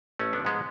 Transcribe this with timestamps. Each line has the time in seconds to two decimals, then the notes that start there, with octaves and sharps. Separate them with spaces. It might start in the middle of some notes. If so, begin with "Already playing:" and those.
0.19 A1 A3 C#4
0.33 B3 D4
0.40 F3
0.45 G#2 G#3 B3